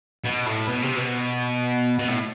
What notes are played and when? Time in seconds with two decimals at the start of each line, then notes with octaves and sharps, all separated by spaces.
0.24 B2
0.46 A2
0.68 B2
0.82 C3
0.96 B2
1.99 B2
2.08 A2